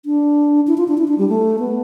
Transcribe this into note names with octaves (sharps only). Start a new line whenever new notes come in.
D4
E4
F4
D4
E4
D4
G3
A3
B3